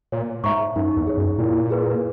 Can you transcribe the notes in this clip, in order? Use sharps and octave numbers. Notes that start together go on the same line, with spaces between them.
A#2 C#5
G#2 E5 A#5 C#6
F#2 D#4
E2
G#4 C#5
F#2
A#2 E4
G#4 B4